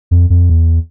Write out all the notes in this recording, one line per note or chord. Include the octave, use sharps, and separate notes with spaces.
F2
F2
E2